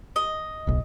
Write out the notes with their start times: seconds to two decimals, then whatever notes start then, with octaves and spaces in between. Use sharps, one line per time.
0.16 D#5
0.67 D1 B1